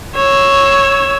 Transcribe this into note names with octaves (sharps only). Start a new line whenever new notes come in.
C#5 E6